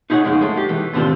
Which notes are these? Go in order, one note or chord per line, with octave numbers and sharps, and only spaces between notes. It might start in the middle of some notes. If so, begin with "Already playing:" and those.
D#4 E4 G#4 C#5 F#5
F2 C#3 G#3
G#3 A3
G4
E3
D#2 A2 B3 C4 D4 F4